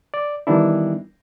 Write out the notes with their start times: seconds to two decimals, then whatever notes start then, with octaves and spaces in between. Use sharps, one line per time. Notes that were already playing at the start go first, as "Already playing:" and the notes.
0.14 D5
0.47 D#3 E3 G3 B3 D4 E4